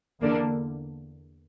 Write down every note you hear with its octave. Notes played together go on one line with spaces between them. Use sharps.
E2 D3 A#3 D4